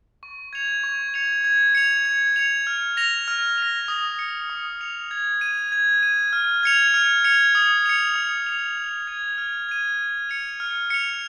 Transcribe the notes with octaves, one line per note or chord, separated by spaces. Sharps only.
C#6
G#6 C#7 F7
C#6
G#6 C#7 F7
G#6
C#7 F7
G#6
C#7 F7
F6
A#6 F7
F6
A#6 F7
D#6
C#7 F7
D#6
C#7 F7
G#6
D#7
G#6
D#7
F6
G#6 C#7 F7
F6
G#6 C#7 F7
D#6
C#7 F7
D#6
C#7 F7
F6
G#6 D#7
F6
G#6 D#7
F6
C#7 F7
F6
C#7 F7